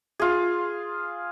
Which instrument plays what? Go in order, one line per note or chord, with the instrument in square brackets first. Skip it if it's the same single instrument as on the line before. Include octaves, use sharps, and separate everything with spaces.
[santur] F4 G#4